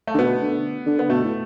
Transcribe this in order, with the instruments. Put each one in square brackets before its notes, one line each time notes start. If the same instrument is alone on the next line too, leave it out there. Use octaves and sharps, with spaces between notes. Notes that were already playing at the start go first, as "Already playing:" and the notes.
[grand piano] A3
[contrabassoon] D3
[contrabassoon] B2 [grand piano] B3
[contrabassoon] D3
D3
[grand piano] B3
[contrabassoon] B2 [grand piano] A3
[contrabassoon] A2